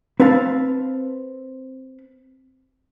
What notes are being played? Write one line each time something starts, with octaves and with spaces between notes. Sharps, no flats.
C4 B4 F5 A5